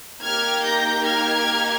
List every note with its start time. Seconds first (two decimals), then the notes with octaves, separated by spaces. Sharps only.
0.22 A#3 D#4 G4 F6 G#6
0.63 G6 A#6
1.05 F6 G#6